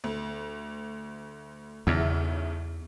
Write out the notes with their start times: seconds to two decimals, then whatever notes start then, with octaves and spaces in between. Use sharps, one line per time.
0.04 D2
1.87 B1 E2 C#3 E5